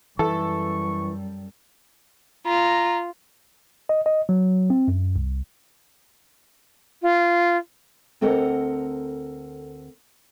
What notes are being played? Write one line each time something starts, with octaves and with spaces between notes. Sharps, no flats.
F#2 E3 G3 A4 C#6
F4 A#5
D#5
D#5
F#3
C4
F#2
C2
F4
D2 C4 A4 A#4 D#5 F#5